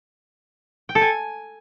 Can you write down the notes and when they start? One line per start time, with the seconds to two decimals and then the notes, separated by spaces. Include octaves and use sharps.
0.89 G5
0.95 A4
1.01 G#5